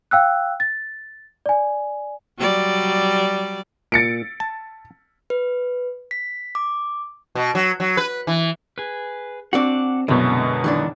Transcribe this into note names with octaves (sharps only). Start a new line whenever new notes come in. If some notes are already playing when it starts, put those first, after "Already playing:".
F5 G5 E6 F#6
A6
D5 G#5
F#3 G3 D5
A#2 A6 C#7 D7
A5
B4
B6
D6
B2
F#3
F#3
B4
E3
G#4 B4
C4 D4 F#4 F#5 D6
C2 F#2 B2 D3 G#3 B3
D#3 E3 D4